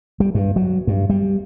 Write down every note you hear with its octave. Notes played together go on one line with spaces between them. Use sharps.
G3
G2
F#3
G2
G3